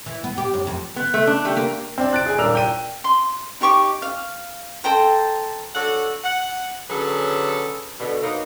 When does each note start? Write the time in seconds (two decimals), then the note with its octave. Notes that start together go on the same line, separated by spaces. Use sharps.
0.06 E3
0.24 B3
0.38 G4
0.54 F#2
0.67 F2
0.96 B3
1.14 A3
1.27 D4
1.45 A3 G4
1.57 A#3
1.98 C4 D4
2.13 F#6 A6 D7
2.26 G#4 G#5
2.38 D#1 D4 A#4 E6 F7
2.55 G5 D#7
3.04 C6
3.61 D#4 G4 C#6 D6
4.02 F5
4.84 A4 C5 G5 A#5
5.75 F#3 D4 F#4 A4 F#5
6.24 F#5
6.90 D3 F#3 C#4 G#4 A4 B4
8.00 B2 D3
8.22 F#3 A#3 B3 D#4